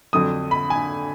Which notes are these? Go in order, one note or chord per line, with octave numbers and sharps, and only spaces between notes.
F2 D3 F#3 D#6
B5
G#5